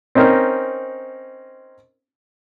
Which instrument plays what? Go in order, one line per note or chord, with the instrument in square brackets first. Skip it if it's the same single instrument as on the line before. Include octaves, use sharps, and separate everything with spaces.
[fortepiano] C4 C#4 D#4 A#4